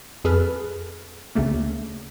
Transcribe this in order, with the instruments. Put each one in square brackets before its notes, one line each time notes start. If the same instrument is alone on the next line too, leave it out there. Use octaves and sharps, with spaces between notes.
[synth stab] F2 G#4 A4 B4 F6
D2 C#3 A3 A#3